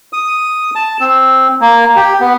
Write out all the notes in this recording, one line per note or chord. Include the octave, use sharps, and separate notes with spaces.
D#6
A5
C4
A#3
G4
B3